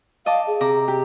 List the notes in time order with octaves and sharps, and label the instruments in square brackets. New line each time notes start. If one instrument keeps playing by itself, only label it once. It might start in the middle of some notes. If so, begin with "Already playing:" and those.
[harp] D#5 A5 D6 [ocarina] F5
[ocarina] G#4
[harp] C3 A#5 D6
G4